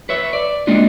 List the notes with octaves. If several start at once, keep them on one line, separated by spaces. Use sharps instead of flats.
B4 C#5 E5
D5
G#3 A#3 D4 D#4 F4